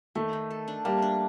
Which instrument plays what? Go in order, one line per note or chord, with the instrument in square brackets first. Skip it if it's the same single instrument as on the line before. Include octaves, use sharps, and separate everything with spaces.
[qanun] D#3 [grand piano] A3
[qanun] D#3
A4
D4
[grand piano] G3 A#3 [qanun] A3
[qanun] D4